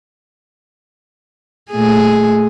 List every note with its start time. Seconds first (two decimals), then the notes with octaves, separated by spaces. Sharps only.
1.71 A#2 A3 G#4